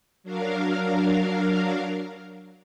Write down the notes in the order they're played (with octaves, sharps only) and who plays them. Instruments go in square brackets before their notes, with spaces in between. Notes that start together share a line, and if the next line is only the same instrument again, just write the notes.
[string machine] F#3 D4 A#4 F5